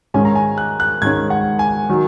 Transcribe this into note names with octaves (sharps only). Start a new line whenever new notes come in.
G#2 D#3 G#3 C#4 G#5
A#5
G#5
F#6
F#6
G#2 D#3 G#3 C#4 G#6
F#5
G#5
D#3 F#3